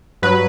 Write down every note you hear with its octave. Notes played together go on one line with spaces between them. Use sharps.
G2 F#3 B4